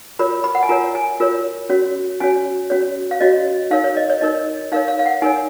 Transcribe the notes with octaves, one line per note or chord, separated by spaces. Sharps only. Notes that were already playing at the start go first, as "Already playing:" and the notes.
F4 A#4 C#5 B5
B5
F#5
G#5
F4 A#4 C#5 A#5
G#5
F4 A#4 C#5
C#4 F#4 C#5
C#4 F#4 C#5 G#5
C#4 F#4 C#5
F5
C#4 F#4 C#5 D#5
D#4 A#4 C#5 F5
C#5
D#5
C#5
D#4 A#4 C#5 D#5
D#4 A#4 C#5 F5
F5
F5
F#5
D#4 A#4 C#5 G#5